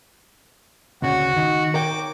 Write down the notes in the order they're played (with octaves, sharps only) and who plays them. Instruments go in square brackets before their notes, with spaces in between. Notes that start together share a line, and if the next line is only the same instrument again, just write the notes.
[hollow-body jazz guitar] D2 C#3 [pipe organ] F#4
[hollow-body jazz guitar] D#3
[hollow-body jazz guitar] A#4 C#5 G5 [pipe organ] D6